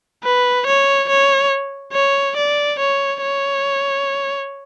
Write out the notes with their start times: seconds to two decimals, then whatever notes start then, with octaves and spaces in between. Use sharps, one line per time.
0.24 B4
0.67 C#5
1.09 C#5
1.93 C#5
2.37 D5
2.79 C#5
3.22 C#5